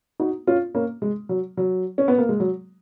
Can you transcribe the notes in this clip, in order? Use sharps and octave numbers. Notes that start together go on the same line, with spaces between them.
D#4 F#4
C#4 F4
A#3 C#4
G#3
F#3
F#3
C#4
B3
A#3
G#3
F#3